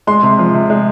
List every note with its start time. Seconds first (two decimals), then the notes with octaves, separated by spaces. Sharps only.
0.07 G#3 C6
0.23 C3
0.39 F3
0.54 C3
0.70 G#3